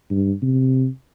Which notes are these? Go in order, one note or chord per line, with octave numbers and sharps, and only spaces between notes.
G2
C3